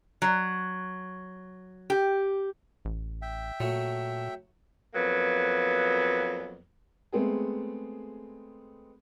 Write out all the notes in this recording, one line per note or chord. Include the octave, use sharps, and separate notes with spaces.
F#3
G4
A1
E5 G5
A#2 F#3 A3
F2 F#3 A#3 B3
G#3 A3 B3 C4 G#4